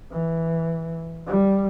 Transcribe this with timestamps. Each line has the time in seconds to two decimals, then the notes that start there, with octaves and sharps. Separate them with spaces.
0.12 E3
1.27 G3